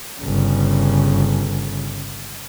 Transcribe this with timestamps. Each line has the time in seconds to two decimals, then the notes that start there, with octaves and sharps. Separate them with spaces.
0.20 G1 C#3